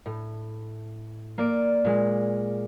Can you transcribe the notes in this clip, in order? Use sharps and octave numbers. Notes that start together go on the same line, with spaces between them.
A2
A#3 D5 D7
A#2 G#3